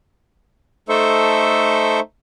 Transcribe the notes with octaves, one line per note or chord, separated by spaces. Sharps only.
A3 D#4 A4 C5 E5 C#6